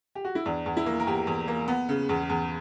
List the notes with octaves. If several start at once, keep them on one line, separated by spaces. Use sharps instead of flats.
G4
F#4
E4
E2 D4
E2
E4
A#3
A#4
E2 G4
E2
A#3
B3
C#3
E2
E2